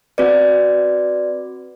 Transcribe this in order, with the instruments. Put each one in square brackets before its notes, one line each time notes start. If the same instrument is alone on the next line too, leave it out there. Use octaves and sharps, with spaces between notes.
[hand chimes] C4 F#4 B4 D5